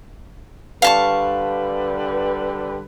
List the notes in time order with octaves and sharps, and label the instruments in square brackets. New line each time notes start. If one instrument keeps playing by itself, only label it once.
[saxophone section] D3 G3 B4 [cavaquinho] F5 A5 C#6